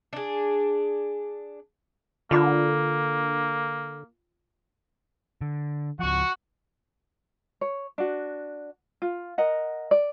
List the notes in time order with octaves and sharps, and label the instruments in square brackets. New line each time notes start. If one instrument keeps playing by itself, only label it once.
[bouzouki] D4 G#4
[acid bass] D3 [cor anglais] A#3 [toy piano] F4 B5 D6
[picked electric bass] D3
[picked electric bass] C#2 F3 [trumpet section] F#4 F#5 C#6
[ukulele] C#5
D4 F#4
F4
A#4 D#5 F#5
D5